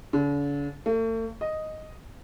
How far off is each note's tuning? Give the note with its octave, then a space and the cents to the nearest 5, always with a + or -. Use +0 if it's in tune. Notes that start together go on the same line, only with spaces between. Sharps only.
D3 -45
A3 +40
D#5 +0